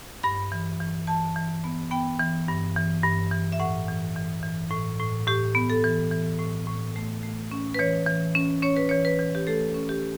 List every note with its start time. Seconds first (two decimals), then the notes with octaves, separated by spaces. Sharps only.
0.23 G2 B5
0.52 E3
0.80 E3
1.07 E3 A5
1.36 E3
1.64 B3
1.91 B3 G5
2.19 E3
2.48 G2
2.76 E3
3.03 G2
3.31 E3
3.52 E5
3.60 A2 F#5
3.88 E3
4.16 E3
4.43 E3
4.71 A2
5.00 A2
5.27 A2 G4
5.55 B3
5.70 A4
5.84 E3
6.11 E3
6.39 A2
6.67 A2
6.96 A3
7.23 A3
7.51 C#4
7.74 B4
7.79 E3 C#5
8.07 E3
8.35 C#4
8.63 C#4 C#5
8.76 B4
8.89 E3 C#5
9.05 B4
9.19 E3
9.35 G4
9.47 A3 A4
9.74 C#4
9.89 G4